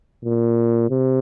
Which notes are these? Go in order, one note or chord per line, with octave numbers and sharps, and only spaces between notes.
A#2
C3